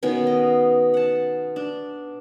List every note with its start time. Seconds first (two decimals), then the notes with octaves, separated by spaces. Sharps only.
0.03 B2 D#3 B3 C#4
0.27 D#5
0.94 F#5 A5
1.56 D4